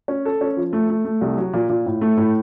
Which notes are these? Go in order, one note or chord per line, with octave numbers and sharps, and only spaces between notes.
C#4
A4
C#4
F3
A3
A3
A3
C2
F#3
A#2
A#2
A2
A3
A2